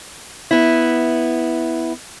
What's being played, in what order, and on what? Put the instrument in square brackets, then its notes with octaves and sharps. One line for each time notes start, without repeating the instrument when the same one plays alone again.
[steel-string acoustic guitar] B3 E4